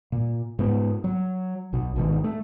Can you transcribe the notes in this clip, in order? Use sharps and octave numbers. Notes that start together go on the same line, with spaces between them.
A#2
G#2 B3
F#3
B1 B2
G#1 B2 D#3
A3